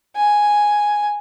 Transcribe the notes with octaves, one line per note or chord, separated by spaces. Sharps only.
G#5